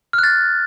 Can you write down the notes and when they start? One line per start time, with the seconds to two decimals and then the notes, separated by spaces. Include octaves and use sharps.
0.13 F6
0.18 F#6
0.23 A6